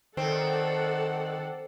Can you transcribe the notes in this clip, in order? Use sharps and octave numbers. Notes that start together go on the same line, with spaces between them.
D#3 C4 A4 D5 F#5